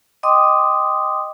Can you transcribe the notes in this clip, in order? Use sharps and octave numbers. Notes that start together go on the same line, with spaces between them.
D#5 G5 C6 D6 D#6